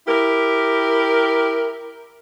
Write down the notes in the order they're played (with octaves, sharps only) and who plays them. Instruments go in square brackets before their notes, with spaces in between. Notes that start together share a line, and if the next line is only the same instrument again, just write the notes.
[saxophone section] E4 G4 A#4